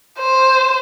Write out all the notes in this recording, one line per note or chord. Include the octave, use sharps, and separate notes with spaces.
C5